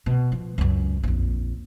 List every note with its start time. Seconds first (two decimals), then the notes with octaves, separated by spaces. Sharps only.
0.06 B2
0.32 F3
0.58 C#2 F#2
1.03 A#1 F2